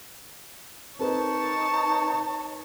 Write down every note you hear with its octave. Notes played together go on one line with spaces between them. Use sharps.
C4 D#4 A#4 B4 C#5 A5